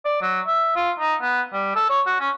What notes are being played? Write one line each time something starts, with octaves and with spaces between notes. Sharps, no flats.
D5
F#3
E5
F4
D#4
B3
G3
A4
C#5
F#4
C#4